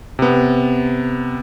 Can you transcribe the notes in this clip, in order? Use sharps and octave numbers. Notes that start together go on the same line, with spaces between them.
C3 B3